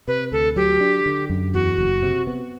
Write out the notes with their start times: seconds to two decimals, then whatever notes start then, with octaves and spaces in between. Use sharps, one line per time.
0.08 C3 B4
0.32 D2 A4
0.56 F#3 G4
0.80 D4
1.06 D3
1.30 F#2
1.54 E2 F#4
1.78 F#1
2.02 C3
2.27 B3